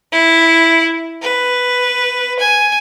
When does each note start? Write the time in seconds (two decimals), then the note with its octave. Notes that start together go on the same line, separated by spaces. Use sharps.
0.12 E4
1.22 B4
2.39 G#5